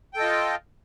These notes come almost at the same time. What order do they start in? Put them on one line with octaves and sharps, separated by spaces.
G5 A4 D#5 F4